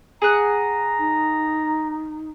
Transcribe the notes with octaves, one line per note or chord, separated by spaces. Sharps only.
G#4 F#5 A#5
D#4